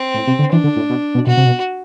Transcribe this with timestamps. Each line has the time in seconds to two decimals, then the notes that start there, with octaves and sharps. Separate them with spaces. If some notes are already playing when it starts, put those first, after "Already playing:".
Already playing: C4
0.14 A2
0.27 C3
0.39 D3
0.52 E3 D4
0.64 D3
0.76 A2
0.90 B2
1.15 B2
1.27 B2 F#4
1.37 C3
1.46 B2